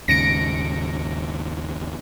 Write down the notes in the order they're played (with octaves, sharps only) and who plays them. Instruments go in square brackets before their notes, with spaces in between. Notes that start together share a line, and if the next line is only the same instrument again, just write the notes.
[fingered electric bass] D#2 G#2 C#3 [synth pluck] A#6 C#7 D7